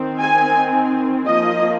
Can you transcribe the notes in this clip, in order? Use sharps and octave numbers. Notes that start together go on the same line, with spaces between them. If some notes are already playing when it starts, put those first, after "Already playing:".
Already playing: D#3 C4
G#5
F3 A#3 D#5